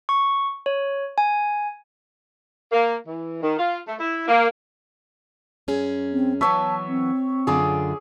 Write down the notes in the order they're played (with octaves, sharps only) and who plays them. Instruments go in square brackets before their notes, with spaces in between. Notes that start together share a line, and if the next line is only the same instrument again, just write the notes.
[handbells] C#6
C#5
G#5
[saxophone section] A#3
E3
D#3
F4
A3
E4
A#3
[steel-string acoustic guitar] F#2 C#4 G#4
[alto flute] C4
[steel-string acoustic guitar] E3 F#3 B3 [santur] C#5 E5 [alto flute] A5
[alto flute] C4
[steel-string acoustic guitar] F#2 D3 F4 [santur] G#4 D6